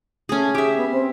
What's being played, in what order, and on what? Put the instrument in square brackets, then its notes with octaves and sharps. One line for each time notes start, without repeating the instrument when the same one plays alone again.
[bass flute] A3 [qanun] C#4 G#4
[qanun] G4 E5 [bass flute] G#4
[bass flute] B3
C4